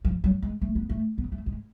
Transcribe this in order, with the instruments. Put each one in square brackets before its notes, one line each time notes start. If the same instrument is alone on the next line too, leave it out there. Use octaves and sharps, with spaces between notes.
[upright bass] F3
F#3
G#3
A3
B3
A3
B3
A3
G#3